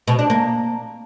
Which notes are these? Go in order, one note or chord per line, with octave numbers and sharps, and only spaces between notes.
B2
D4
A#3